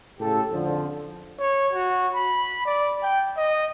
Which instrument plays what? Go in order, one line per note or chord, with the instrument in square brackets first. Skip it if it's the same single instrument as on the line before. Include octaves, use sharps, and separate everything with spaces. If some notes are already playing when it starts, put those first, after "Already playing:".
[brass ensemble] A2 C#3 G4 A4
F2 D3 F3
[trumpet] C#5
F#4
B5
D5
G5
D#5